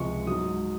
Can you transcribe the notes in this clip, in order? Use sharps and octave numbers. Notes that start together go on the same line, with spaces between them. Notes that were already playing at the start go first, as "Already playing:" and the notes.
Already playing: C#2 C3 F3 G#3 C#6
G#2 F#3 D#6